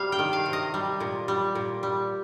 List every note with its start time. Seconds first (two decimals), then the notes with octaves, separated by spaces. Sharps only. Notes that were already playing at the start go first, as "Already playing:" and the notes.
Already playing: C3 G3 F5
0.12 G5
0.19 D#3
0.33 F5
0.46 C3
0.53 D#5
0.74 G3
1.00 A#2
1.28 G3
1.55 A#2
1.83 G3